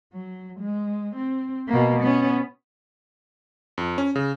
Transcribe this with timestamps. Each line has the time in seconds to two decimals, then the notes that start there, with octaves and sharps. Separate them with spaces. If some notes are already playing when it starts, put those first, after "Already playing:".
0.13 F#3
0.59 G#3
1.16 C4
1.68 B2 A#3
2.02 B3 C#4
3.78 F2
3.98 C#4
4.15 C#3